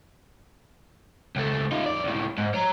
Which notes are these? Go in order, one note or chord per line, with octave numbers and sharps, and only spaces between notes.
C#2 A3
D#4 F4
F2 D5
C#2 A2
G#2
C#5 A#5